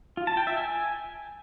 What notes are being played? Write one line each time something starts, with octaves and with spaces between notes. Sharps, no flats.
F4
A5
G5
E5
G#5